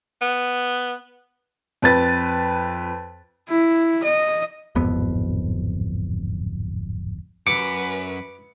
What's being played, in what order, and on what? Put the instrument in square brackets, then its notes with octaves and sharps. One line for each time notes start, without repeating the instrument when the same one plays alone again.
[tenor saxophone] B3
[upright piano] F2 B4 A6
[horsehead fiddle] E4
D#5
[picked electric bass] D1 G#1 F2 B3
[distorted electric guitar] F#2 [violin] B4 [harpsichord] D6 [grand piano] C#7